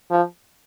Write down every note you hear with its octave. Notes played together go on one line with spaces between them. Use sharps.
F3